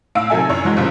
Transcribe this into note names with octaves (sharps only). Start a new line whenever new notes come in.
A2 F5 E6 D7
C3 D#3 F#3 A4 E5 G#5
F#2 E4 C#5
G#2 E3 F#3 G#3
G1 G2 A#2 C#3 F3